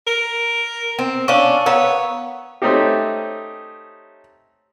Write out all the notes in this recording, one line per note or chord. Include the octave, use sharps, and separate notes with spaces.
A#4
C4
C#4 D4 F5 C#6
B3 A#4 C#5 F5 A#5
A3 C4 C#4 D#4 G4